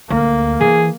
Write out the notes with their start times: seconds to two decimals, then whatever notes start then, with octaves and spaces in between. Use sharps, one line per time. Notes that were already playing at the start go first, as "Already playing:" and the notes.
0.10 D2 A#3
0.61 E3 G#4